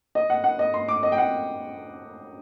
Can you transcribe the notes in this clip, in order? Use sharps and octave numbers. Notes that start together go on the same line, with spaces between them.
D#5
F#5
F#5
D#5
C6
D6
D#5
G5
F#5